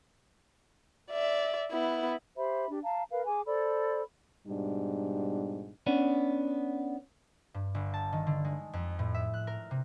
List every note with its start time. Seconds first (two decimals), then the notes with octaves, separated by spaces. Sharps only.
1.11 D5 E5
1.71 B3 E4
2.37 G4 C5 E5 B5
2.70 D4 G4
2.84 F5 A5 A#5
3.12 A#4 B4 F5
3.26 G#4 G#5 D6
3.46 A4 C5 D5 B5
4.47 G#2 B2 G3 D4
5.87 B3 C#4 D4
7.54 G2
7.75 G1
7.94 A5
8.13 D#3
8.27 D3
8.45 G#3
8.73 F2
8.99 A2
9.14 E5
9.34 F#6
9.47 A#4
9.71 C3